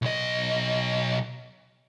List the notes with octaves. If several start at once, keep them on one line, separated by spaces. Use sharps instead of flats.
B1 D#5